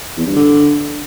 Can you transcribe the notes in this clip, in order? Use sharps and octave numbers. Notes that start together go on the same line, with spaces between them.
E2
G2
D3